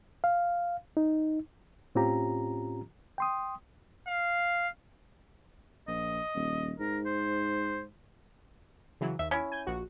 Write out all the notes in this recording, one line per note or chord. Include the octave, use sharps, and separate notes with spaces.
F5
D#4
A2 C4 C#4 F4 G4 A#5
G5 C6 D#6
F5
A#1 D#5
D#1
G#2 A#4
C5
C#3 E3 F#3
D#2 E5
C#4 E4
G#5 G6
A#1 F#4